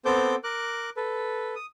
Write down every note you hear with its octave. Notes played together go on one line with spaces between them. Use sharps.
B3 C4 A4 C5 D6 G6
A#4 D6 F#6
A4 B4
D#6